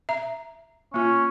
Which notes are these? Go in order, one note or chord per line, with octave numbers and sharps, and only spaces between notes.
E5 A#5
A#3 C#4 F4